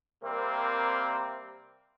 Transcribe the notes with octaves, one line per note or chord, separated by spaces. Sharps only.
C3 G3 A#3 C4 A#4